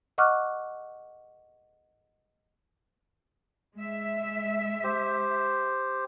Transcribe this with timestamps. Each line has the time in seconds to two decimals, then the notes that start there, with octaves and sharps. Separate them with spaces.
0.18 D#5 F#5 C#6 D6 F6 F#6
3.76 G#3 E5
4.84 G4 C5